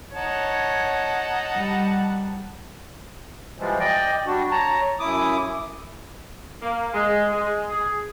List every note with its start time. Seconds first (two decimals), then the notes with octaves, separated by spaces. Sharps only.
0.15 D#4 C#5 F#5 A5
1.56 G3
3.58 E3 F3 G3 G#3
3.80 D5 D#5 G5
4.27 G3 D4 F#4
4.51 C#5 A5 A#5
5.00 F#2 E4 D6 D#6
6.62 A#3
6.94 G#3
7.32 G#3
7.70 G#4